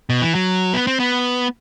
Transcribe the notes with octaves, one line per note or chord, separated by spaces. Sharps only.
B2
E3
F#3
B3
C4
B3